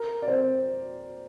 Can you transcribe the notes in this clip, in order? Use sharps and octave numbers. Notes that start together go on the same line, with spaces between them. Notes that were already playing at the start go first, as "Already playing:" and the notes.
Already playing: A#4
D5
C4 C5